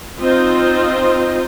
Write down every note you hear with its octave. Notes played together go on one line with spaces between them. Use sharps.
C4 D#4 F4 C5 D#5